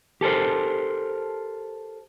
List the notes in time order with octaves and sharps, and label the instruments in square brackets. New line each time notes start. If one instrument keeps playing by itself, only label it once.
[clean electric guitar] G4 A4 A#4 C5